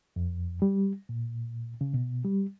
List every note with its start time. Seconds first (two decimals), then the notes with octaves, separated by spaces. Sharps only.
0.16 F2
0.62 G3
1.09 A#2
1.81 C#3
1.94 B2
2.25 G3